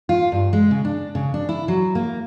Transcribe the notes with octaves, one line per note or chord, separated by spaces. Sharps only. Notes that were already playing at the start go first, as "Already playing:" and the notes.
F4
G2
G#3
C#3
D4
C#3
D4
E4
F#3
A#3